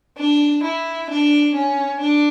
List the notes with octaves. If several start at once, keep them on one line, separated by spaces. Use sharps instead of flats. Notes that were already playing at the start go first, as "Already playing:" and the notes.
D4
E4
D4
C#4
D4